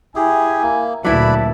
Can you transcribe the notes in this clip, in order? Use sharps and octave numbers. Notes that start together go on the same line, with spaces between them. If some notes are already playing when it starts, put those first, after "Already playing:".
E4 G4 G#4 G#5
A#3
D2 A#2 F#3 E4 A4 B4 D5 B5